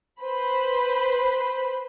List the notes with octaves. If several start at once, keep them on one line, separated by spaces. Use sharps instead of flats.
B4 C5 B5